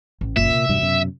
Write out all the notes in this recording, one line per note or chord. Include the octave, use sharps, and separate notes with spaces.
A1
F#1 E2 A#2 A#3 E5
C3
E1 G2 F#3
F#2 B2